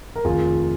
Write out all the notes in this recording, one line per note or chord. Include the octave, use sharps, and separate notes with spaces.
A#4
F1 D#2 D#3 F4 G#4